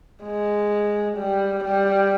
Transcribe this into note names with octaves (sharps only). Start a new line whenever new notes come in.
G#3
G3
G3